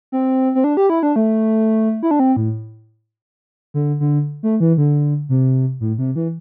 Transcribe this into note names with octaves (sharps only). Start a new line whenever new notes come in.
C4
C4
D4
G4
E4
D4
A3
E4
D4
C4
A2
D3
D3
A3
E3
D3
C3
A2
C3
E3